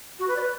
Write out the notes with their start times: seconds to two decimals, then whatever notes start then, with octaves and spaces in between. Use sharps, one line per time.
0.19 F#4
0.28 B4
0.36 D5
0.40 B4